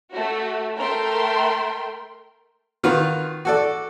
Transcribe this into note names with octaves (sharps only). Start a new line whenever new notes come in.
A3 F#4
A3 A#4 G5 C6
D#3 F4 F#4 B4
F#4 A4 D5